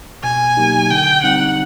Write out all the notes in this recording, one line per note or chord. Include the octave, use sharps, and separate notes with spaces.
B2 G#5
F#3 A#3 D#4 G4
D3 G5
G3 C4 D#4 F#5